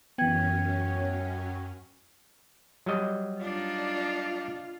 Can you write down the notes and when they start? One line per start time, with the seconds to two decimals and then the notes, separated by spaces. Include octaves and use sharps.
0.18 F#2 E3 F#3 B3 C#4 G5 G#6
2.86 F#3 G3 D#5
3.41 D4 D#4 F4